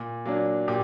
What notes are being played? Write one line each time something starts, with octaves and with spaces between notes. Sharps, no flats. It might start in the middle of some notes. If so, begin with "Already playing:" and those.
Already playing: A#2
F#3 A#3 D4
A#2 G4